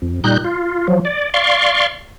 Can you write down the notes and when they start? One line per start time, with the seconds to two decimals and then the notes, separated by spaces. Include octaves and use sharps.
0.02 F2
0.24 A#2 G3 D#4 F#6 G6
0.44 F4
0.88 F3 F#3
1.05 D5
1.34 D5 F5 C6 C#6